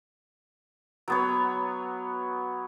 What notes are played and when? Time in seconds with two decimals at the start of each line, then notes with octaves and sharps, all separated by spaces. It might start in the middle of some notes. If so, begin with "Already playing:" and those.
1.08 F#3 B3 C#5